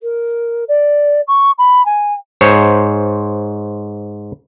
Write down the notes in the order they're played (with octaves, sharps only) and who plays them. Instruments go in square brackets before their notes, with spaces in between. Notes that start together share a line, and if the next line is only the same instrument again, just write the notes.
[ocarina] A#4
D5
C#6
B5
G#5
[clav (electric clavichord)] G#2 C5 C#5